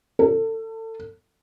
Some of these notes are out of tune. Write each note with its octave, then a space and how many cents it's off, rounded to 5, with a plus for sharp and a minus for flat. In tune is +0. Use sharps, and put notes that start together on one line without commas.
A4 +30